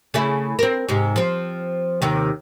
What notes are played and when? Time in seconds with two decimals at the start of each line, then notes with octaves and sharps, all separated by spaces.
0.14 C#3 A3 E4
0.59 C4 A#4
0.89 G#2 C3
1.16 F3 C4
2.02 D#2 C3 D#3